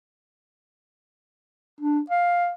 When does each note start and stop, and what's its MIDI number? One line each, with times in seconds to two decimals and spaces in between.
1.81 2.00 62
2.10 2.51 77